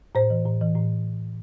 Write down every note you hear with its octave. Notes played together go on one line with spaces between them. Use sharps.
A2 C5
E3
A2
E3
A2